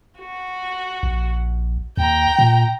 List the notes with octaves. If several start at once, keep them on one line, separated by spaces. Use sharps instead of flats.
F#4
A#1
D#2 G5 A#5
A#2